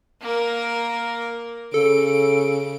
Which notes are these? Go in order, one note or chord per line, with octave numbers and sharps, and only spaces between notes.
A#3 A#4
C#3 A4 D7